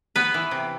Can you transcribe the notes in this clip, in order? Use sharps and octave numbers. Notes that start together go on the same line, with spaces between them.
B3 B4
E3
C3